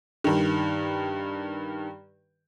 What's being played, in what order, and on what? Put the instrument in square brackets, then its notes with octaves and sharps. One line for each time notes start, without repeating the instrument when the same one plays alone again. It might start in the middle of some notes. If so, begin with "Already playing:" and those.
[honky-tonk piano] G2 D#3